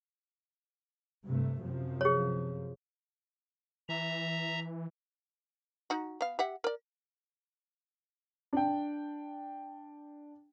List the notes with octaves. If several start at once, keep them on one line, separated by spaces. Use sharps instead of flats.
G2 C3 A3
F#2 C3 F3
G#4 C#5
E3 E5 A#5
D#4 F#4
B3 F5
G4 E5 F#5
A#4 D5
D4 G5